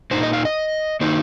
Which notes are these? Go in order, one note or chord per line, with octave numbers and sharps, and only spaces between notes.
A#2 A#3 D#4 C5
D#5
F5
D#5
D#3 A#3 D#4 C5